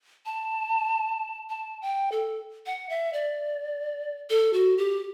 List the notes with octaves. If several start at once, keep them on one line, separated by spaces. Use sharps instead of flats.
A5
A5
G5
A4
F#5
E5
D5
A4
F#4
G4